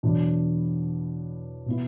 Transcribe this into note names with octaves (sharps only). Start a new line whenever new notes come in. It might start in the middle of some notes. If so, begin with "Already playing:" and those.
E2 B2 F#3 D4
B2 B3 E4